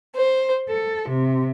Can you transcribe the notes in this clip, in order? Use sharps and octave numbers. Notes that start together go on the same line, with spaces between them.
C5
A4
C3